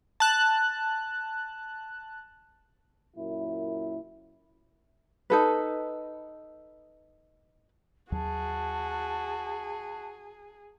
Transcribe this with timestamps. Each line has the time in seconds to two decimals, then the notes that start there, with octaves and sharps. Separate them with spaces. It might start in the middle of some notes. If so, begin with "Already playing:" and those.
0.20 A5 F#6
3.16 F#2 A#2 E4
5.30 D#4 A4 B4
8.12 D#2 F#3 F#4 G#4 A5